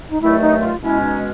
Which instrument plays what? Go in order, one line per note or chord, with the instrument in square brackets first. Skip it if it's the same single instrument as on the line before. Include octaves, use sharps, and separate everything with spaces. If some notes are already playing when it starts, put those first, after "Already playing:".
[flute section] D#4
[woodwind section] G2 D#3 F#3 A3 [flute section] E4
[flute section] D#4
F4
[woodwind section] B2 G#3 C#4 [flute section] E4
[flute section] D#4